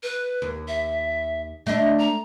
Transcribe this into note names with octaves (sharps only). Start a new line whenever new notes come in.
B4
D#2
E5
A3 D4 D#5
A#5